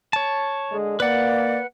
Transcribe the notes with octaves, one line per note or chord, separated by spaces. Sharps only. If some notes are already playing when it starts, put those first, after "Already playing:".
C#5 A5
D3 G#3
A#3 B4 D5 F#5